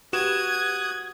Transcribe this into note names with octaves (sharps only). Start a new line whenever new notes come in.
F#4 G4 B4 D#6 F#6 G#6 E7